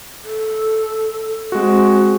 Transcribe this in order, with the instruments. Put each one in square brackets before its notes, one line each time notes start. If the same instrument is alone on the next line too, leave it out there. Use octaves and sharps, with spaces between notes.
[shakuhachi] A4
[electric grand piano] G#3 F#4 [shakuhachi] C4